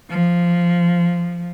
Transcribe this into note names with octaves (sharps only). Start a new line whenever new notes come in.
F3